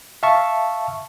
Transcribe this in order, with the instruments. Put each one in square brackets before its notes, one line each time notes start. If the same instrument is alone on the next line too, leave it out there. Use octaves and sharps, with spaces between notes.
[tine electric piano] E5 F5 A5 C#6